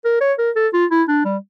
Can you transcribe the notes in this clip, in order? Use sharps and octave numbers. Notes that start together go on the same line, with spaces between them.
A#4
C#5
A#4
A4
F4
E4
D4
G3